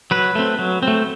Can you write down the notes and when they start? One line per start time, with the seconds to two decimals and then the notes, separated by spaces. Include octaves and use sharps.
0.11 F#3 B4
0.35 A3 C4
0.59 F#3
0.83 C4
0.88 A3